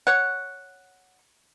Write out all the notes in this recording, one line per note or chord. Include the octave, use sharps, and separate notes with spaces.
C#5 F#5